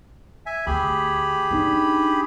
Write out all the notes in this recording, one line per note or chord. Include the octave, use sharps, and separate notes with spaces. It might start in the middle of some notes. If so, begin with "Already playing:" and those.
E5 G#5
D2 G4 G#4 B5
D4 D#4